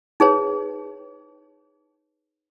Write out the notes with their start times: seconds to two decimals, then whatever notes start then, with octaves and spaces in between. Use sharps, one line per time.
0.20 D#4 G#4 B4 C#5